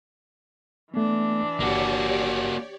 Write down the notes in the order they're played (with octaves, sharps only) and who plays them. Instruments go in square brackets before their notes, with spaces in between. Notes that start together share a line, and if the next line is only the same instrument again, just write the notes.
[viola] E3 D4 [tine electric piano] A3 B3
[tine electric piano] G1 [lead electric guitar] A#3 F#4 [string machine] G4 C#5 D5